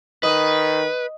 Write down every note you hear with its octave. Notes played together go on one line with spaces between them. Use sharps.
D#3 B4 D#5